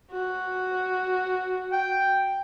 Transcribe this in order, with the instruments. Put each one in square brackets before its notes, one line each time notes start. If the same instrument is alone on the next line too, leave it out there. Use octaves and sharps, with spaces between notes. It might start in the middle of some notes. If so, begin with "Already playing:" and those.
[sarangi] F#4
[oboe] G5